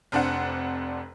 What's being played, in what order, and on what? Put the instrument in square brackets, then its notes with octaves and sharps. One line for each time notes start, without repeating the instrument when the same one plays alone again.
[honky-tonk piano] F1 F2 D4 C5 F#5